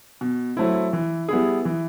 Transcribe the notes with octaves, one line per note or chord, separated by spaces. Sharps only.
B2
F#3 A3 C4 E4
E3
G3 B3 E4 G#4
E3